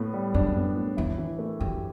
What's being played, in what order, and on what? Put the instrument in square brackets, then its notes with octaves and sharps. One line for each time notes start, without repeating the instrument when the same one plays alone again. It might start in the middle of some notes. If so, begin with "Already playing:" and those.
Already playing: [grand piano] A2 B3
G3
[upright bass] F#2 [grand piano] D4
[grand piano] B3
A2
[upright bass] E2 [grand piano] E4
[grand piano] E3
A3
[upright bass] F#2 [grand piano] G4